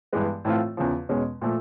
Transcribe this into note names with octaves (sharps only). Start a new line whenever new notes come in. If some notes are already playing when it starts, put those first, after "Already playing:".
G2 E3 G#3 B3
A2 E3 A3 C4 F4
E2 C#3 F3
E2 B2 G#3 C#4
A#2 F3 A3